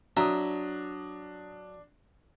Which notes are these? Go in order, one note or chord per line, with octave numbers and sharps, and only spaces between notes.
F#3 D4 E5 A#5 D#6